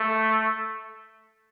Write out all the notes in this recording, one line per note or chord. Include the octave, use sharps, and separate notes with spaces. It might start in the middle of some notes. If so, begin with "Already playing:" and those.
Already playing: A3